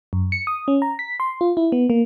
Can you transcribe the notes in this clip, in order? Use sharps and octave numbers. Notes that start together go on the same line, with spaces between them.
F#2
C#7
D#6
C#4
A#5
B6
C6
F4
E4
B3
A#3